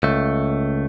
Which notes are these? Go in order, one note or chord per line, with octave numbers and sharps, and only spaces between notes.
C#2 A3